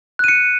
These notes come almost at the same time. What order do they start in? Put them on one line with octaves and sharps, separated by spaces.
F#6 D#7 C#7